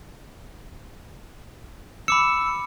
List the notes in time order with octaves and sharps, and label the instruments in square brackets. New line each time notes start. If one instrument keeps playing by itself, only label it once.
[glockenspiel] B5 D6 C#7 [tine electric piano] E6